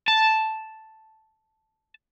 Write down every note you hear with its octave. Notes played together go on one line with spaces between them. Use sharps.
A5